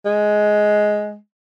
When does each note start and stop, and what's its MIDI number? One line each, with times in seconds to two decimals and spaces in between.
0.05 1.16 56